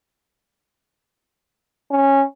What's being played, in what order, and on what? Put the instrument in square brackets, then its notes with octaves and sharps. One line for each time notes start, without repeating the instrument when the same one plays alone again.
[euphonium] C#4